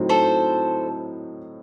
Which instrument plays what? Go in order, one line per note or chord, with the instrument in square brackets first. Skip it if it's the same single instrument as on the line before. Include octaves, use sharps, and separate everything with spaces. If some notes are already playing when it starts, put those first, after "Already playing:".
Already playing: [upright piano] A2 F#3 C4 D#4
[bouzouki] A4 C5